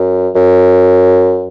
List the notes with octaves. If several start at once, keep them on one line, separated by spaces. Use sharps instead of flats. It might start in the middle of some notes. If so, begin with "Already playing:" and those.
Already playing: F#2
F#2